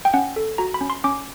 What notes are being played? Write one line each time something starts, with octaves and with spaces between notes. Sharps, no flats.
G5
C#4 F#5
A4
F#4 A#5
B5
C#4
C6
C#4 D6